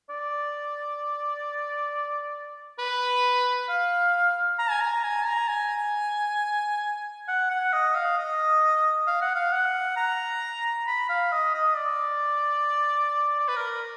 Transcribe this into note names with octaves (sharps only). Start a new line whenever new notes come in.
D5
B4
F5
A#5
G#5
A#5
G#5
A#5
G#5
F#5
F#5
D#5
F5
D#5
F5
F#5
F5
F#5
A#5
B5
F5
D#5
D#5
D5
D5
B4
A#4